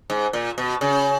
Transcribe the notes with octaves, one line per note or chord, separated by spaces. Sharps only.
G#2
A#2
B2
C#3